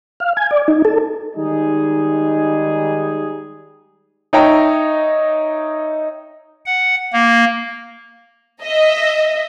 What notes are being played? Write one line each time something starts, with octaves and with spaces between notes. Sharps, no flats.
F5
G#5
D5
D#4
A4
D#3 G3 G#3 D#4 G#4
D#4 C#5 E5 G5 A#5
F#5
A#3
D#5 E5